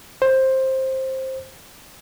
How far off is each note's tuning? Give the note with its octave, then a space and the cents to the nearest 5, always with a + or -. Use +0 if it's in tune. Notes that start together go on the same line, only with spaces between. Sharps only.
C5 +15